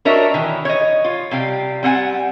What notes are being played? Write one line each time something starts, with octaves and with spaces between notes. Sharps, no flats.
D4 F#4 A#4 C#5 D#5 E5
D#3 E3
C#5 D#5
F4
C3 G3 F5 G5
G3 C4 F#5 G#5